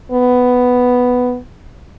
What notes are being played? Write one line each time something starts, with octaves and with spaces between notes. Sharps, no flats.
B3